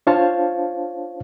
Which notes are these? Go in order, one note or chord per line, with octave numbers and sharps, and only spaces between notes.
D4 F4 C5 C#5 F5 A5